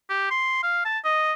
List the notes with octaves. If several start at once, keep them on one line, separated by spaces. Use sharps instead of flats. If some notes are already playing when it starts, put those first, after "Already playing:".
G4
C6
F5
A5
D#5